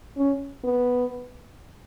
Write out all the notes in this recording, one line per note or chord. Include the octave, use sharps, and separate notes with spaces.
C#4
B3